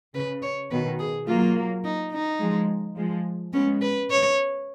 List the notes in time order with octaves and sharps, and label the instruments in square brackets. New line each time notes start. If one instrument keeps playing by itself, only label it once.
[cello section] C#3 [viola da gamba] B4
[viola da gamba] C#5
[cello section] B2 D#3 [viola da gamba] B4
[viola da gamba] G#4
[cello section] F#3 A#3 [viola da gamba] F4
[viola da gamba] D#4
D#4
[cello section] F3 G#3
F3 G#3
[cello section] G#3 B3 [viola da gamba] C#4
[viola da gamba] B4
C#5